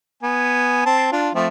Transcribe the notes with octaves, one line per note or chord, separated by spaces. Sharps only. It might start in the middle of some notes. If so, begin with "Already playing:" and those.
B3 G#5
C4 A5
D4 F4
F3 A3 C4